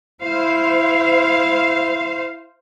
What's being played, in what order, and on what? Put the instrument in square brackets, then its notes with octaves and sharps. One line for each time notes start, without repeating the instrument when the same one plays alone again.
[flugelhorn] E4 [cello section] C5 F5